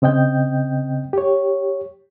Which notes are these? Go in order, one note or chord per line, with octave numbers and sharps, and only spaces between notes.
C#3 C4 D#5 G5 G6
G4 C#5